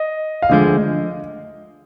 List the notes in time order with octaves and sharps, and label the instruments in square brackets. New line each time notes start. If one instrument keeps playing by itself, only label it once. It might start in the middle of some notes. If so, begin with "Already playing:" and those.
Already playing: [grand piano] D#5
F5
[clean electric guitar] D2 D3 F3 G#3 [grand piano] D#5